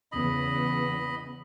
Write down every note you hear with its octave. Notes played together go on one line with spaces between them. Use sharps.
E2 C#3 B3 D#5 B5